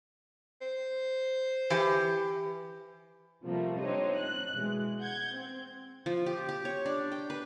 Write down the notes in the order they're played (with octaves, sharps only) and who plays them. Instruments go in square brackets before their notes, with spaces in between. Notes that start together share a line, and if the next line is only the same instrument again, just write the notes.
[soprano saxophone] C5
[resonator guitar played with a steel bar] E3 G4
[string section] C3 F3 G3 A3 A#3
C4 D4 D#4 C5 C#5 D#5
F#6
B2 E3 G#3
F#5 G6 G#6
C4
[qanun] F3
G4
G4
C#5
D4
G5
B4